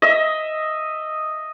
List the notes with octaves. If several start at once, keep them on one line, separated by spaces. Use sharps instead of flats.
D#5 E5